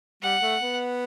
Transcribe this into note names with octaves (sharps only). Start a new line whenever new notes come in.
G3 F#5
A3
B3